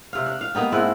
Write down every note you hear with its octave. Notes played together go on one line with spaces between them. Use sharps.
C3 F5
D4
F5
A#3 B3 D#4 G4
G#2 C4 D4 E4